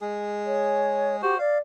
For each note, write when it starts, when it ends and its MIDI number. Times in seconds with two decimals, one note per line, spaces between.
0.01 1.21 56
0.01 1.21 68
0.46 1.16 73
1.22 1.38 66
1.22 1.38 67
1.22 1.38 72
1.39 1.57 74
1.39 1.58 77